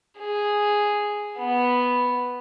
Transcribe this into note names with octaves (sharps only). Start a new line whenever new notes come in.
G#4
B3